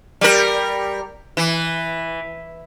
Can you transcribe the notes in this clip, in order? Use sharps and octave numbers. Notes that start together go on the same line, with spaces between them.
G3 A#4
E3